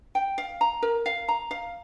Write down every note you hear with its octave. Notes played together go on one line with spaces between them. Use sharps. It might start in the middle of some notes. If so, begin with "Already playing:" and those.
G5
F5
A#5
A#4
F5
A#5
F5